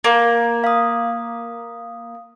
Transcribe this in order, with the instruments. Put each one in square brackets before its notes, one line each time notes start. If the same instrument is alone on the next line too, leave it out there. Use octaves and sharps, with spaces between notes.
[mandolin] A#3 [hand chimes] D6
[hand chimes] F5 D#6